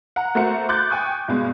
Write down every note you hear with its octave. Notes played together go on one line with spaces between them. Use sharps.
F#5 A#5
A3 A#3 F#4 C5 A#5 C#7
C6 D6 F#6 G6 A6
G5 G#5 C#6 D#6
G2 B2 G#3